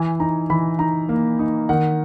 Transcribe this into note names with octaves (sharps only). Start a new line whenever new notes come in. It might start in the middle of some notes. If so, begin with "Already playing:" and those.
Already playing: E3 G#5
D#4 A#5
E3 B5
D#4 A#5
A#3
D#4
D#3 F#5